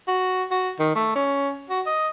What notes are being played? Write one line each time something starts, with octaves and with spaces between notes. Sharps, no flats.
F#4
F#4
D#3
A3
C#4
F#4
D#5